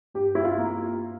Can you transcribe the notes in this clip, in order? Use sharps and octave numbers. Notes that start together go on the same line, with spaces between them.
G2 G4
E4
F4
A#3